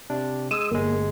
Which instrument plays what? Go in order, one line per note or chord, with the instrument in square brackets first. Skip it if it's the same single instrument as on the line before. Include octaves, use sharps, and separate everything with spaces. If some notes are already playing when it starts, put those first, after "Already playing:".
[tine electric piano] C3 D4
[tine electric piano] G#3 [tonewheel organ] D#6 E6
[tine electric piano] G1 G#3 [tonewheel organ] A#3